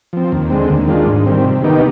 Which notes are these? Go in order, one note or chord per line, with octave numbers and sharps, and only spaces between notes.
F3 C4
D#2
D3 G#3 C4
D#2
D#3 G#3 D4 F4
G#2
D#3 G3 C4
C3
D#3 B3 D#4 G4